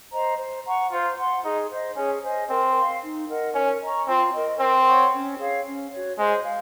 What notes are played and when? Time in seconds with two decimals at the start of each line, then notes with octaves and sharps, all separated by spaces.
0.13 C5 D#5 A#5
0.39 C5
0.66 F#5 A#5 C#6
0.92 F4 C5
1.18 F#5 C6
1.45 D#4 G#4
1.71 C5 D#5
1.97 C#4 G#4
2.23 C5 D#5 G#5
2.50 C4 A#4
2.76 F5 C6
3.03 D#4
3.28 A#4 D#5 F#5
3.55 C#4 A#4
3.81 D#5 A#5 C#6
4.08 C4 F4
4.34 A#4 D#5
4.60 C4 A#4
4.86 C#5 F#5 C#6
5.13 C#4
5.39 G#4 C#5 F5
5.65 C#4
5.92 F#4 C#5
6.18 G#3 C5
6.44 F5